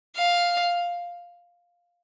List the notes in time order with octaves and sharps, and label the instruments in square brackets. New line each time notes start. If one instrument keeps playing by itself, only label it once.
[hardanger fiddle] F5